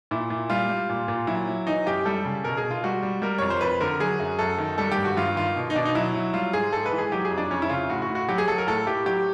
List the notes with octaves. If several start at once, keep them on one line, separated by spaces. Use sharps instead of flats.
A#2 E4
A#2
G3 F4
G3
A#2
A#2
F#3 E4
F#3
E3 D#4
F#2 G4
G3 A4
C#3
B2 A#4
G#4
B2
F4
G3 F#4
G3
G3 A#4
F2 C#5
C5
F2 B4
D3 A#4
F#3 G#4
F#2
F#2 A4
D#3
G3 A4
G4
G2
F#4
G2 F4
D#3 F4
B2
D#4
B2 D4
D#4
F#3 E4
F#3
G3 F4
G#2 G#4
G#2 A4
B4
E3
G#4
F#3 G4
G#4
F2
D4
F2 C#4
E4
C#3 F4
A2 F#4
F#4
A2
F#4
F#3 G4
G#4
F#3 A4
A#4
A2 A4
A2 G4
F#3 G4